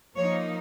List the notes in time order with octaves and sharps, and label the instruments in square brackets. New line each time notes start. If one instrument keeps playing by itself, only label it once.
[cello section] F3 A#3 D#4 C#5